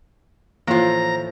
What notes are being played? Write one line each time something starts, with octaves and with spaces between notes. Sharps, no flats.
A2 E3 F3 A#3 F4 A#5